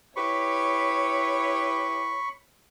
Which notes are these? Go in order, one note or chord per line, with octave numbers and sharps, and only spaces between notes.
E4 G4 B4 C#5 B5 C#6